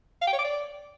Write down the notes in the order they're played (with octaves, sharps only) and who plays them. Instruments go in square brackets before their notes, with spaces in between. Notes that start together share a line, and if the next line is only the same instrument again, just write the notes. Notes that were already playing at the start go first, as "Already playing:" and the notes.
[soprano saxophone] F5
G5
C#5
D6
D5